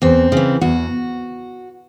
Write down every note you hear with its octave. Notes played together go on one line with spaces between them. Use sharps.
E2 C4
C#3 E3
E2 F#4